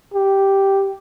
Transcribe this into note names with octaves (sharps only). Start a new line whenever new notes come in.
G4